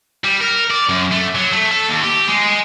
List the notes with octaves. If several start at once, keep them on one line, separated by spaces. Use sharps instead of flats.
G3
A#4
D5
F#2
A3
F#3
A3
A4
D#2
G4
G#3